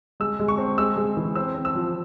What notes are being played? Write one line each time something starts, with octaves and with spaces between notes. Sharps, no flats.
G#3 E6
G#3
C#6
C4
G#3 E6
G#3
E3
C4 E6
C4
E6
F3